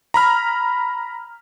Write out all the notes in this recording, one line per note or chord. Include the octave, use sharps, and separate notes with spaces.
A#5 B5 F6